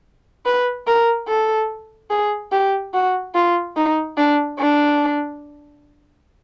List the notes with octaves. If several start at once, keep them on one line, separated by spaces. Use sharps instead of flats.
B4
A#4
A4
G#4
G4
F#4
F4
D#4
D4
D4